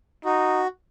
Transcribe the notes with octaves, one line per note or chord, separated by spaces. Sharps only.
D#4 F#4